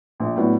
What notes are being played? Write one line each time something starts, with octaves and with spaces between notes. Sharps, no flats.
A#1
A2 F#3 B3 D4